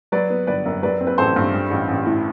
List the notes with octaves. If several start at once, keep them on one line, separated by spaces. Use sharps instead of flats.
F#3 B4 D5
B3
G1 B4 D5
F#2
F#3 B4 D5
C4
B4
A1 A4 C5
G2
G3
A1
A1
A2